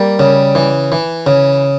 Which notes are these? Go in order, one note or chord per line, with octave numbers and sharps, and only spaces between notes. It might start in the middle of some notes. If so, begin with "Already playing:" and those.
Already playing: G3 A#3
C#3
E3
E3
C#3